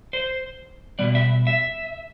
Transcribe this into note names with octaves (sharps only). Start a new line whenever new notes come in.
C5
B2 G3 B3 D5
E5
E5